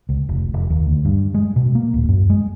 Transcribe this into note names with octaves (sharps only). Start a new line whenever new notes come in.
C#2
F1
F1
D#2
D2
G2
G#3
B2
A#3
D1
F#2
G#3